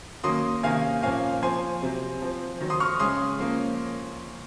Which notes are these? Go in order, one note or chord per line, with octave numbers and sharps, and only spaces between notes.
D#3 F#3 A#3 C#4 C6 D#6
C3 D#3 A#3 C#4 F5 G#5
A#2 F3 A#3 C#4 F5 G#5
F3 C4 G#5 C6
C3 F#3 C4
F3 C4
D#3 F#3 C4
C6 D#6
C#6 F6
C#3 G#3 C#4 C6 D#6
F3 A#3 C#4